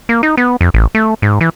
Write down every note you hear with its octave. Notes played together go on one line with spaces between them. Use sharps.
A#3
D#4
B3
F2
A1
A3
G#2
E3